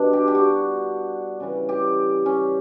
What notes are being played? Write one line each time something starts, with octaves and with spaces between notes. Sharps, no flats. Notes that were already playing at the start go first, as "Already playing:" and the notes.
Already playing: B2 G3 D4
G4
G4
F#4
C#3 E3 G3
G4
C#4